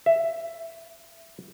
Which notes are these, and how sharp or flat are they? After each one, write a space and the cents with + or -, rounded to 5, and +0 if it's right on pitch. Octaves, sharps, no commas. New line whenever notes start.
E5 +10